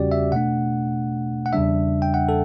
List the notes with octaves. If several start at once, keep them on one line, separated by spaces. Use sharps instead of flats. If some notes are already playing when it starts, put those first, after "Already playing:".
Already playing: E2 C#3 G3 C#4 F#4 G4 D5
E5
B2 A3 D4 F#5
F#5
E2 C#3 G3 D4 E5
G5
F#5
A4